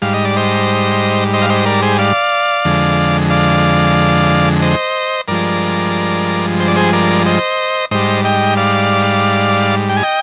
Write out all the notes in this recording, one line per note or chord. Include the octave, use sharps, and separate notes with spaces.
G#2 G3 F5
D#5
D5
C5 D#5
C5 D#5
F5
C5 D#5
A#4 D5
G#4 C5
D5 F5
F2 D3 G#3
D5 F5
C5 D#5
G2 F3 G#3 A#4 D5
C5
D5
G#4 C5
A#4 D5
C5 D#5
G#2 G3 C5 D#5
D#5 G5
D5 F5
G5
G#5
D#5 G5